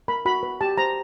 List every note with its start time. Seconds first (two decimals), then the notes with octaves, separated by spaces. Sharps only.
0.08 A#4 B5
0.26 F#4 B5
0.43 B4
0.61 G4 A5
0.78 C5 A#5